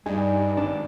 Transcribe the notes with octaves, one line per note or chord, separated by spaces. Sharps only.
G2 G3 D#4 G#4
G#1 D4